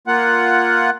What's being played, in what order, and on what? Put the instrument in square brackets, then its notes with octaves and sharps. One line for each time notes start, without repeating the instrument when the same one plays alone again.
[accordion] A#3 F4 F#5